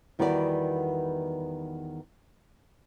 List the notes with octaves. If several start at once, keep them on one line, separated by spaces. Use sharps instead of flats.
E2 D#3 G3 B3 F#4 D5